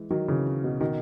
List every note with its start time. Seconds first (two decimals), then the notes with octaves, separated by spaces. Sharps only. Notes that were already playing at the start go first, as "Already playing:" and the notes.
Already playing: E3 G#3
0.10 D#3 F#3
0.28 C#3 E3
0.64 B2
0.81 B2 D#3